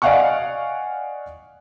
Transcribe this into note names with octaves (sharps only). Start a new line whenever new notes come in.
D5 D#5 F5 F#5 G#5 C#6